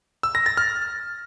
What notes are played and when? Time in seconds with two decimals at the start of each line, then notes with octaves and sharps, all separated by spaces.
0.23 E6
0.35 A#6
0.46 A6
0.57 F6